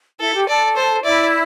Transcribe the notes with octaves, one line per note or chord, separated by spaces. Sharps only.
E4 A4
G4
A4 D5
C5
E4 D5